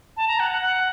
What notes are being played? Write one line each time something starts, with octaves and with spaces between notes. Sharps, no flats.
A5
A#5
F#5
F#5
F#5